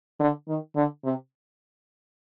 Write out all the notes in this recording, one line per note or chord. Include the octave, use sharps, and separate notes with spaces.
D3
D#3
D3
C3